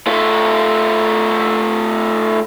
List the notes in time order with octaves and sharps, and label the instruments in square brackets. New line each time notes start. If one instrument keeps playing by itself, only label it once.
[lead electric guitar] A3 F4